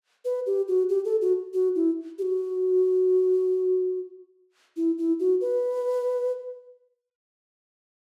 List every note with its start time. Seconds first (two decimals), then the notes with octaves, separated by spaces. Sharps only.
0.25 B4
0.47 G4
0.68 F#4
0.89 G4
1.05 A4
1.22 F#4
1.54 F#4
1.76 E4
2.18 G4
2.22 F#4
4.77 E4
4.98 E4
5.20 F#4
5.41 B4